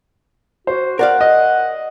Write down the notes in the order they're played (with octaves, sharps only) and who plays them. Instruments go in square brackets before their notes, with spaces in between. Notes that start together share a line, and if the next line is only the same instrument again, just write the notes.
[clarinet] F#4 [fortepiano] C5
[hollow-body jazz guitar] A#4 D5 F5 [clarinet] F#5
[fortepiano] D#5